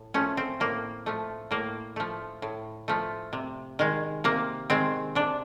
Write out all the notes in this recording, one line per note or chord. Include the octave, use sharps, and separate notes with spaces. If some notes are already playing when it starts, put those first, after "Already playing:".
Already playing: A2
F3 A3 C#4
C4
A2 A#3
F3 A3
A2 A#3
F3 A3
A2
F3 A3
C3
D#3 G#3
C3 A#3
D#3 G#3 C4
C3 D4